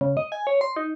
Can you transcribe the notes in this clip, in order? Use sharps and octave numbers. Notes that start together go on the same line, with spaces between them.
C#3
D#5
G#5
C#5
C6
D#4